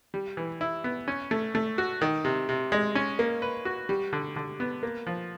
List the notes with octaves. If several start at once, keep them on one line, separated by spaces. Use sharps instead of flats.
G3
E3
E4
B3
C#4
A3
A3
F#4
D#3
C3
C3
G#3
C#4
A#3
B4
F#4
G3
D3
D3
B3
A#3
F3